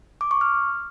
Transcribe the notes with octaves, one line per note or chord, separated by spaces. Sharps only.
D6
C#6
F6